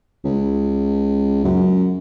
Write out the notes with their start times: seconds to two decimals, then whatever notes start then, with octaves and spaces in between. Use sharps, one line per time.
0.25 C#2
1.44 F#2